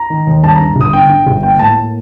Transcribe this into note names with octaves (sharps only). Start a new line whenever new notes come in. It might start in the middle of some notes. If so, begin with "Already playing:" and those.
Already playing: A#5
D#3
D#2
G2 A5
A#5
D3
G1 D#6
D3 G5
D3
G1
A#3 G5
A2 A5
A#3